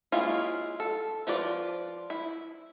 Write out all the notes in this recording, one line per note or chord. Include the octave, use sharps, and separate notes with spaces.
F#3 G#3 A#3 E4 F4
A4
F3 F4 B4 D5
E4